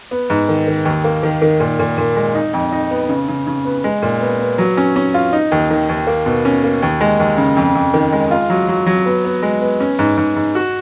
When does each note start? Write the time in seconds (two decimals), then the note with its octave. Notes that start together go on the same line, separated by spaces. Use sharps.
0.11 B3
0.30 G#2
0.49 D#3
0.68 D#3
0.85 D#2
1.04 A#3
1.23 D#3
1.42 D#3
1.60 A#2
1.79 A#2
1.98 A#2
2.16 G#3
2.35 D#4
2.53 F2
2.72 D#4
2.91 B3
3.09 C#3
3.28 C#3
3.47 C#3
3.65 B3
3.84 G#3
4.02 A#2
4.21 B3
4.40 B3
4.58 F#3
4.77 C#4
4.96 C#4
5.14 F4
5.33 D#4
5.52 D#2
5.70 D#3
5.89 D#2
6.07 A#3
6.26 B2
6.45 C#4
6.64 A#3
6.82 D#2
7.01 G#3
7.19 D#2
7.38 C#3
7.56 F2
7.75 F2
7.94 D#3
8.12 G#3
8.31 F4
8.50 F#3
8.68 F#3
8.86 F#3
9.06 B3
9.24 B3
9.43 G#3
9.62 B3
9.80 C#4
9.99 G#2
10.17 G#2
10.36 G#2
10.55 F#4